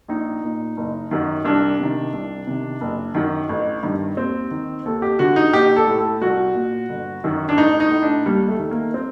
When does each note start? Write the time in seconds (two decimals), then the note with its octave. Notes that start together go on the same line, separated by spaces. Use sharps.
0.08 A#1 D#4
0.44 A#2
0.77 F#1
1.11 F#2 D#3
1.45 C2 D4
1.79 C3 D#3
2.13 C2
2.47 C3 D#3
2.81 F#1
3.15 F#2 D#3
3.49 A1
3.83 G2 D#3
4.17 D#2 C4
4.51 D#3
4.85 D#2 A4
5.02 G4
5.19 D3 F#4
5.36 D#4
5.53 A#1 G4
5.76 A4
5.87 A2
5.98 A4
6.21 C2 F#4
6.55 A#2
6.89 G1
7.24 F#2 D#3
7.49 D4
7.57 A1 D#4
7.80 D#4
7.91 A2
8.03 D4
8.26 D#2 G3
8.48 A3
8.59 D#3
8.71 A#3
8.94 C4